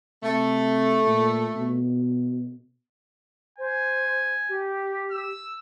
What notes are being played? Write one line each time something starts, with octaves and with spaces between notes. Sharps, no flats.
C3 A3
A#2
B2
C5 G#5
G4
E6